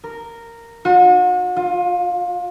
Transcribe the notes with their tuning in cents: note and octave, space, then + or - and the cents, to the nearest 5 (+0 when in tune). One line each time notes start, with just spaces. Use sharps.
A#4 -10
F#4 -40
F4 +25